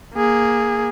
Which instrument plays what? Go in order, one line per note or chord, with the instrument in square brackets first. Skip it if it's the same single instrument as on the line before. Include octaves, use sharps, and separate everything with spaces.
[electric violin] A#3 G#4